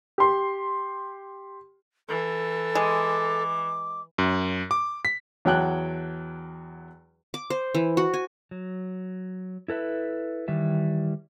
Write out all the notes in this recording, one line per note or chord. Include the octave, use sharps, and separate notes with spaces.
G4 C6
E3 A4
G#3 D6
F#2
D6
B6
E2 F#3 F#5 G5 A5 F#6
D6
C5
E3
F#4
G#5
F#3
E4 A4 B4 E5
D#3 E3 G3 E5